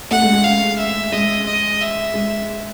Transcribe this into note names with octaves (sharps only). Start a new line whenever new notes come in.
A3 F#5
G#3
G#3
G#3 F5
E5
G#3 D#5
D#5
E5
G#3